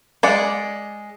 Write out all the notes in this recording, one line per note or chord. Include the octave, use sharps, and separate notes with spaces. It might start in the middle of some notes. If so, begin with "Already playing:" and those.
G#3 D5 F#5